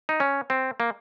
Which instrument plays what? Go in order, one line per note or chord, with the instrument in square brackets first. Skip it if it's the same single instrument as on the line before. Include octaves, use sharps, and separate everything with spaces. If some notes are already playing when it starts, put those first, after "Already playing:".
[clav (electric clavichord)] D#4
C#4
C4
A#3